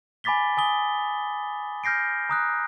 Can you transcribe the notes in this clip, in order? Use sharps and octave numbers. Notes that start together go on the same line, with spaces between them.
G#5 B5 D6 A6 B6 G7
G#5 D#6 G7
F6 G6 A#6 C7 D7
A#5 D#6 F#6